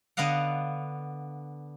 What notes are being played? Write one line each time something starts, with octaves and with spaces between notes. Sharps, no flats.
D3 B3 D#5 F5 F#5